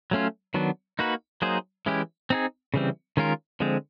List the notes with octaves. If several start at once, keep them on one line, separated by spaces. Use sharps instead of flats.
F#3 A3 C#4 F4
D#3 F#3 B3 D4
A#3 D#4 F#4 B4
F#3 A#3 D#4 G#4 C5
E3 G#3 C#4 E4 G4
C4 D#4 G#4
C#3 E3 G3 C4
D#3 G#3 C#4 F4 A#4
D3 F3 G#3 C4